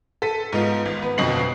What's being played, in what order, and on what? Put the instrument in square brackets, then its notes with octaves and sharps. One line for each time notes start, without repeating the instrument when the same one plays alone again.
[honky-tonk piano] A4 B6 D#7
G#2 B3 D#4 F4
G#1
B3 B4
G1 F2 B2 D#5 C7 F#7